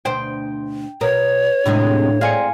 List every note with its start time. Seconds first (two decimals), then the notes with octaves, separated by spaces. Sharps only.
0.05 D2 B2 C5 G5
1.01 B2 A#4 B4 C#5
1.65 D#2 A2 C3 G#3 D4
2.21 G#3 C4 D5 F5 G#5 C#7